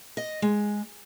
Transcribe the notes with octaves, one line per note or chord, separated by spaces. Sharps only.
D#5
G#3